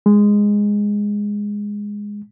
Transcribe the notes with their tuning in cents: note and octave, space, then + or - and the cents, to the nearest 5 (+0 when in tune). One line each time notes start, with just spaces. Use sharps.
G#3 -10